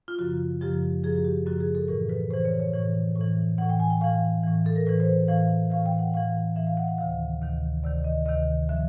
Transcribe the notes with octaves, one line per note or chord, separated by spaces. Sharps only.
F4
F#2 C#3 F3 F#4
F#2 C#3 F3 G4
F#2 C#3 F3 G#4
F#4
G4
F#2 C#3 F3 F#4
G#4
A4
A2 E3 A#4
B4
A2 E3 C5
C#5
C#5
A2 E3
A2
E3
A2 E3 F#5
G5
G#5
G5
A2 E3 F5
A2 E3
A4
A#4
A2 E3 B4
C5
A2 E3 F5
A2 E3 F5
G5
F#5
A2 E3 F5
A2 E3 E5
F5
F#5
F#5
D2 C3 D#3 F5
D2 C3 D#3
D2 C3 D#3 D5
D#5
D2 C3 D#3 D#5
D3 F3 E5